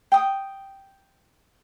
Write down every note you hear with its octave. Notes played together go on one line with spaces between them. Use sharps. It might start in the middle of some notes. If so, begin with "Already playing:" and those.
G5 D#6